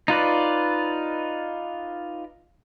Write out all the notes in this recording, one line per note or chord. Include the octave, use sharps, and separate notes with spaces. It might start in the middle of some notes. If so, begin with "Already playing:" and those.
D#4 F4 B4 D5